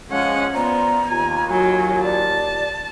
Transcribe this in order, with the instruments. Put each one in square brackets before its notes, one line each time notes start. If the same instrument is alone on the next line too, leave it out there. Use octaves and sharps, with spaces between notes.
[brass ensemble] F3 G#3 F5 [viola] C#4 F#5
[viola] B3 [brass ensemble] F4 C5 D5 [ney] A#5
[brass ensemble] D#2 F4 [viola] G#5
[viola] F#3 [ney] G#5
[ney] D5 [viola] A5